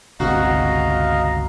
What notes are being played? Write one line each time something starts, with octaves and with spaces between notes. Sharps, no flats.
G1 C#2 C3 F#4 D#5 F5 A#5